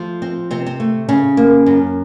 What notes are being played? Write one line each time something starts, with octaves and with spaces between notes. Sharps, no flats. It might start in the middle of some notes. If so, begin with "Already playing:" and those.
Already playing: F3 A3
C4
C3 C4
C4
A3
C#3 C#4
A#3
F#2